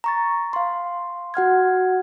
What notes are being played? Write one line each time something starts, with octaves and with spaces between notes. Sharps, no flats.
A#5 C#6 A6
F5 C6
F#4 F#5 F6 G#6